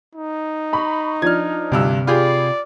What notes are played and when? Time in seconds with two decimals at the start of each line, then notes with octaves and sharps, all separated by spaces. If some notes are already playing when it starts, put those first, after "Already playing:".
0.15 D#4
0.73 A#5 B5 C#6
1.22 F3 D4 F6 G#6
1.72 D2 G2 C3 E6
2.07 F4 G4 G#4 D5 B5